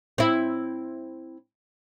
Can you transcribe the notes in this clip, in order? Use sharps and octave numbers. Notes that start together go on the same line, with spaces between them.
C4 E4